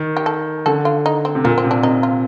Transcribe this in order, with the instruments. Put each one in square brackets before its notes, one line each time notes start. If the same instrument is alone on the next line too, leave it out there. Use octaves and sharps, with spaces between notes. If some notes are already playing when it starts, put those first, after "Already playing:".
Already playing: [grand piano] D#3
[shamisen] G4
A4
[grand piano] D3 [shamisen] A4
[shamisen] F4
D#4
C4
[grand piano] C3
[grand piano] A#2 [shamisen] A#3
[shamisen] C4
[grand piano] C3
[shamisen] D4
[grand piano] C3 [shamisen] D#4
[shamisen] F4